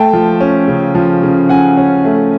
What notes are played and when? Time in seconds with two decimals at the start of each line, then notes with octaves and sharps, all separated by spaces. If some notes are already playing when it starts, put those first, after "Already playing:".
Already playing: A3 G5 A5
0.13 F3
0.41 C#4
0.68 C#3
0.95 F3
1.23 C#3
1.49 C#3 F#5 G#5
1.77 C#4
2.05 A3